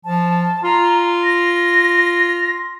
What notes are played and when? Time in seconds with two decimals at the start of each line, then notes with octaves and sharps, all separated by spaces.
0.05 F3 A5
0.64 F4 A#5
1.24 A#6